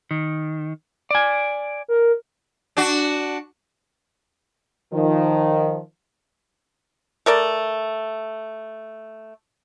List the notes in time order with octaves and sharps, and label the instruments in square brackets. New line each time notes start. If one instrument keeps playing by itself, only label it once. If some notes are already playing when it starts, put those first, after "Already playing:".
[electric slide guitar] D#3
D5 G#5
[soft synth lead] A#4
[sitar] D4 F#4
[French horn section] D#3 F3
[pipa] A3 A#4 D5